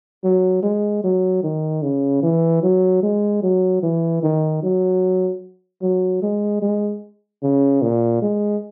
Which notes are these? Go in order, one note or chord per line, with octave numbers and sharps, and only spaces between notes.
F#3
G#3
F#3
D#3
C#3
E3
F#3
G#3
F#3
E3
D#3
F#3
F#3
G#3
G#3
C#3
A#2
G#3